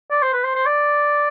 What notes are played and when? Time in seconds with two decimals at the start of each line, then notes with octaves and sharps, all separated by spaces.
0.11 D5
0.22 C5
0.33 B4
0.44 C5
0.55 C5
0.66 D5